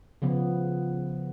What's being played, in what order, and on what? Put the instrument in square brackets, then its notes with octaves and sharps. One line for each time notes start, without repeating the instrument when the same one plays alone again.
[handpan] C#3 F3 B3